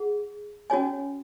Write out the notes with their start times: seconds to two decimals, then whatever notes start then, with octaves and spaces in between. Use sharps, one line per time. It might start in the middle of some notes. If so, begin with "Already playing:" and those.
Already playing: G#4 F#5
0.70 C#4 F#4 C#5 G#5